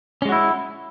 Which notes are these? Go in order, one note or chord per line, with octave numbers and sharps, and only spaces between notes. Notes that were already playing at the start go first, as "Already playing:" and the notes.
G#3 C#4 E4 F#4